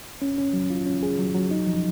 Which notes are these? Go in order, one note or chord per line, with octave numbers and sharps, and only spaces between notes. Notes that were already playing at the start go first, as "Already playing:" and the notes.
C#4
C#4
F#3
F4
C#4
G#4
F#3
F#3
D#4
F3